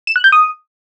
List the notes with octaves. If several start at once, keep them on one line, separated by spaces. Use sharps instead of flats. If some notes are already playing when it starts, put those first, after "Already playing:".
E7
F#6
G6
D#6